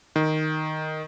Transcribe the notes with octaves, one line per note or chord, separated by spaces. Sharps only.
D#3